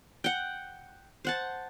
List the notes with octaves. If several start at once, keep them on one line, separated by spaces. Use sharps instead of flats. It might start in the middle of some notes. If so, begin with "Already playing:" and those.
F#5 G5
C5 F#5 A5